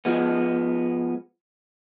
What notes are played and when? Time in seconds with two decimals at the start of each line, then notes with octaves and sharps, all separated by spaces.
0.05 F3 G#3 B3